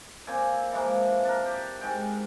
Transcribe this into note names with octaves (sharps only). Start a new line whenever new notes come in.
A#2 C4 G#5 D6
E3 F3 G#3 A#3
D4 A#4
G4
G#2 G#3 G5